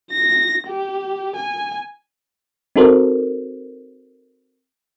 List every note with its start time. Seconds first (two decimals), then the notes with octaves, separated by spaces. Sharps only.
0.12 A#6
0.67 G4
1.36 G#5
2.76 C4 D#4 F#4 A4 A#4 C5